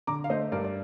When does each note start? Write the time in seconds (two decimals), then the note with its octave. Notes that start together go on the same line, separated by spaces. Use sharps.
0.07 D3 A#5 D6
0.24 F5
0.30 A3 C5 D#5
0.52 G2 A#4 D5
0.64 D5